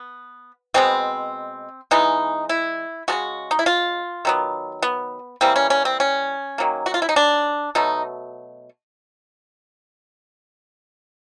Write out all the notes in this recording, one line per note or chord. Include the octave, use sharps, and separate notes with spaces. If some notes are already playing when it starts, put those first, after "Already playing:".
Already playing: B3
B2 G#3 B3 C4
E3 G#3 B3 D#4
E4
C#3 F3 G#3 F#4
D#4
E4
F4
D#3 F#3 B3
B3
E3 G3 A#3 C4
C#4
C#4
C4
C#4
D#3 F#3 A#3
F#4
F4
E4
D#4
D4
B2 F#3 A3 D#4